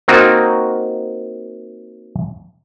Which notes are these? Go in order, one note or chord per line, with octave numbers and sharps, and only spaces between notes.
A#3 C4 D#4 F4 F#4